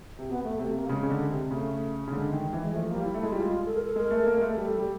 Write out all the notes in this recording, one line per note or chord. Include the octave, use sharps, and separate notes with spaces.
C3
B2 B3
A3
C3 A3
A#3
C#3 G#3
C#3
D3
C3
C#3 A3
C#3
D3 G#3
D#3
E3
G#3
F3 A3
G3 A#3
E4
A3
G#3 E4
G3 F4
G#3
A4
A#4
A4
G#3 A#4
A3
A#3
G#3
A3
G3 A4
G3